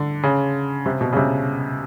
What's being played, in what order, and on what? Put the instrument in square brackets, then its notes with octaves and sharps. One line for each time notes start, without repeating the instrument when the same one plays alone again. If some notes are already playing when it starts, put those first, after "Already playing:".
Already playing: [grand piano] D3
C#3
C3
B2
C#3
C3